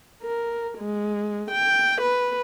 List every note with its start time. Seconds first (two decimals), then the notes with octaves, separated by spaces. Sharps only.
0.23 A#4
0.79 G#3
1.51 G5
2.02 B4